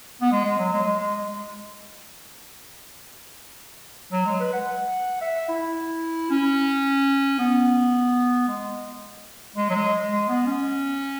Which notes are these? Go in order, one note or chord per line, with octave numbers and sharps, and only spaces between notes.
B3
G#3
G#3
F#3
G#3
G#3
G#3
G#3
F#3
G#3
B4
F#5
E5
E4
C#4
B3
G#3
G#3
F#3
G#3
G#3
B3
C#4